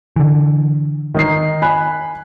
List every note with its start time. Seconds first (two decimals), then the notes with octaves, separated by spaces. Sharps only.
0.16 D3 E3
1.15 D#3 D#4 C7
1.62 G#5 B5 F#6